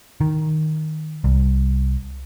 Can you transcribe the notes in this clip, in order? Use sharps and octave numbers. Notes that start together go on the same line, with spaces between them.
D#3
C2